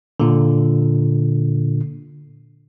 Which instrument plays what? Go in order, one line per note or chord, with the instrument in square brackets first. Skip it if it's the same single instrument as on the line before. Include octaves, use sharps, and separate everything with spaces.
[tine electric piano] A#2 D3